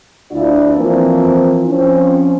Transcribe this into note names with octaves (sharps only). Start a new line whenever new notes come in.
D2 D4 E4 F4 D5
E3 F3 A#3 C4
F3 C4 C#4